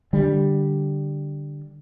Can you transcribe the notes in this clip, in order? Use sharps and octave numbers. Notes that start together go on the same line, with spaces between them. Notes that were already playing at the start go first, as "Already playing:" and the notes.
D3 G3